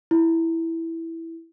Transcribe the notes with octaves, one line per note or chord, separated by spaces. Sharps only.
E4